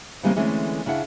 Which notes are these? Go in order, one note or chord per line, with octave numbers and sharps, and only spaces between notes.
C#3 E3 G3 G#3 A#3 C4
D3 E3 G#3 A3 C4 C#4
C#3 D4 E4 F#5